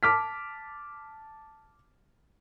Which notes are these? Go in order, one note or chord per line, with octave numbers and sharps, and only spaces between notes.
A5 D6 F6 B6